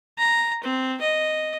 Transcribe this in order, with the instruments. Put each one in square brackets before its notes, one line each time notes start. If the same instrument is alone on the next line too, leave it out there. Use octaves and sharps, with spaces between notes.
[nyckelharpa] A#5
C4
D#5